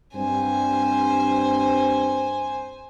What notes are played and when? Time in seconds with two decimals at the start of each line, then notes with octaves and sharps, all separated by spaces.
0.15 G2 C4 C5 G#5